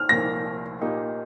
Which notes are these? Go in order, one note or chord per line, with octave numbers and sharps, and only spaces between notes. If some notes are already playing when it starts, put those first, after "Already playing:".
Already playing: F6
C2 A#2 F3 A#3 A#6
A#2 A#3 D#4 G4